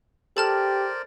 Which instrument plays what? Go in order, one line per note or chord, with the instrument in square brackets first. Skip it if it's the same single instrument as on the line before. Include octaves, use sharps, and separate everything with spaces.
[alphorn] G4 [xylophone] A4 A5 F6 [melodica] A#4 C5 D5